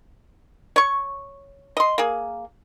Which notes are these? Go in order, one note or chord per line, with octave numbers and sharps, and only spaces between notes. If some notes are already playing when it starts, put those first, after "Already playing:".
C#5 C#6
D#5 C6
A#3 G#4